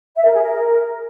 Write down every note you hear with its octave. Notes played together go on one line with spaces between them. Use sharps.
E5
A#4
G#4
A#4